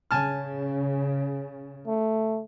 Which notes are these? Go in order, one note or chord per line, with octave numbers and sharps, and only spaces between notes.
C#3 G#5 A5 F6
A3